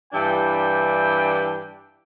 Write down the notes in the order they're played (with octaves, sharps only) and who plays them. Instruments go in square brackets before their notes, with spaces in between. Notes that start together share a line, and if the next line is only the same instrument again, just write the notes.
[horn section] G2 E3 D4 E4 G4 G5